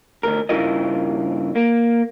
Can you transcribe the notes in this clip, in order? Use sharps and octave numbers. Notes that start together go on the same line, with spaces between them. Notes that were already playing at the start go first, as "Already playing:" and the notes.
D2 G#2 A#4
G2 C#3 E4 F4 A#4 D#5
A#3